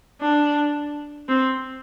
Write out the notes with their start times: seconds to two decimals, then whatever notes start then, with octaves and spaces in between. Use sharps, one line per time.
0.21 D4
1.28 C4